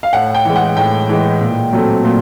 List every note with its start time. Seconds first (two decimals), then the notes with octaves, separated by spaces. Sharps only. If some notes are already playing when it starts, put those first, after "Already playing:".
0.03 F5
0.13 A2 F#5
0.35 G5
0.45 E3 G#3
0.56 F#5
0.77 A2 G5
1.09 E3 G#3
1.41 A#2
1.73 F#3 A3 C4
2.05 A#2